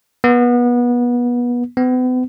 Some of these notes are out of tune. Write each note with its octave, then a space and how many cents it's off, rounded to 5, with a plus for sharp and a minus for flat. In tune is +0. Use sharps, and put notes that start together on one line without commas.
B3 -25
B3 +40